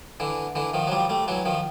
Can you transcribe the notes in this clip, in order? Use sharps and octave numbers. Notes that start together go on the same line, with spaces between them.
D3 E3
D3 E3
D#3 F3
F#3
F3 G3
G3 A3
E3 F#3
D#3 F3